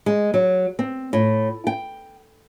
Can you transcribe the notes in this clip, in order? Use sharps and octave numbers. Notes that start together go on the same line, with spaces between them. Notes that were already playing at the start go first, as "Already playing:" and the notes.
G#3
F#3
C4
A2
G5